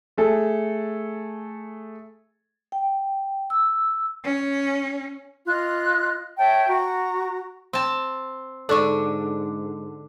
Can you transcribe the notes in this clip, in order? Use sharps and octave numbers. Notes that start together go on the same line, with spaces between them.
A3 G#4 A4
G5
E6
C#4
F4 D#5 F#6
C#5 E5 G5 A5
F#4 A#5
C4 A5
G#2 D3 D4 A4 D5 C#6